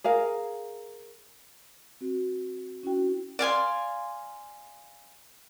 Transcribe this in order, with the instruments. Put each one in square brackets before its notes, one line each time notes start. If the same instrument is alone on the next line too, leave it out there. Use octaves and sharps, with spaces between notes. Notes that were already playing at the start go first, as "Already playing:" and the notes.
[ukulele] G#4 A#4 F5
[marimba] C4 F#4
C#4 E4 F#4 G5
[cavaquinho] D5 F5 G#5 C6